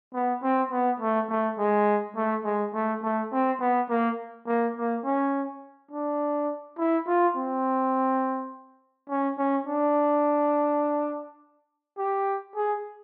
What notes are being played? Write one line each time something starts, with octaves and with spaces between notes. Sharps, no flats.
B3
C4
B3
A3
A3
G#3
A3
G#3
A3
A3
C4
B3
A#3
A#3
A#3
C#4
D4
E4
F4
C4
C#4
C#4
D4
G4
G#4